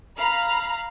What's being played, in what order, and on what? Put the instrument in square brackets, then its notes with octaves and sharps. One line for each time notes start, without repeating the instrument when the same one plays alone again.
[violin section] F5 A#5 B5 F6